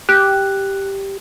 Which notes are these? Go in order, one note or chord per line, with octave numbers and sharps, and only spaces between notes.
G4 F#6